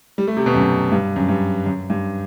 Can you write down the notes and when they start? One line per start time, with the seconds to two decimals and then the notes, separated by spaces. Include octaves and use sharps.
0.18 G3
0.28 A3
0.37 C3
0.46 B2
0.54 F#2
0.92 G2
1.16 F#2
1.28 G2
1.66 F#2
1.90 G2